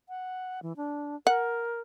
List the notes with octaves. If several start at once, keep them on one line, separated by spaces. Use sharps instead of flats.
F#5
E3
D4
A#4 F#5